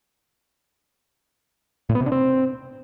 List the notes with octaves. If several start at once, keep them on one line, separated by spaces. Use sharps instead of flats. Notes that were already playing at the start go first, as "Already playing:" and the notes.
A2
B3
C3
D4
C4